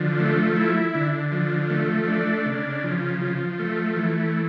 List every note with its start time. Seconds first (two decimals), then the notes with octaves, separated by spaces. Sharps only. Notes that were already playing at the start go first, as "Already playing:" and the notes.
Already playing: D3 F3
0.19 A3
0.56 E4
0.95 D3
1.32 F3
1.70 A3
2.08 D4
2.46 C#3
2.84 F3
3.21 F3
3.59 A3
3.96 E3